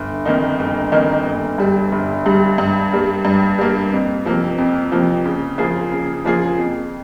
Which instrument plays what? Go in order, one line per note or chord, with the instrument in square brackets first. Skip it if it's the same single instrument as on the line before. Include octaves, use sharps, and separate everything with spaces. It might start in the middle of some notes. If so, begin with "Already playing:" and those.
Already playing: [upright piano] G1
F2 D#3 A#3 D#4
G1
F2 D#3 A#3 D#4
G1
G2 G3
G1
G2 G3
G2
G3 A#3
G2
G3 A#3
F2
C3 F3 A#3
F2
C3 F3 A#3
C#3
F3 A#3 F4 G#4
C#3
F3 A#3 F4 G#4
F2